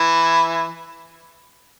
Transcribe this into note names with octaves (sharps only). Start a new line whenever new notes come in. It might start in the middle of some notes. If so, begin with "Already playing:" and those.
Already playing: E3 E4